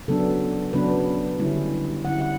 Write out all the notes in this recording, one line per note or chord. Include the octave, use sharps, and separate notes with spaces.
C#3 F#3 B3 D4 A4
C#3 F#3 B3 D4 B4
D3 G3 C#4 E4
D3 G3 C#4 E4 F#5
F#5